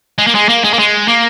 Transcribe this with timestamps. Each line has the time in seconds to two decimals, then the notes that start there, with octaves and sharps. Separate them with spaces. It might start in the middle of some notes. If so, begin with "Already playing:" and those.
0.18 G#3
0.27 A#3
0.35 G#3
0.49 A#3
0.64 G#3
0.73 A#3
0.79 G#3
1.08 A#3